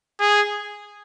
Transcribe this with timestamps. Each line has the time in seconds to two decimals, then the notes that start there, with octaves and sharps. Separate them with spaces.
0.20 G#4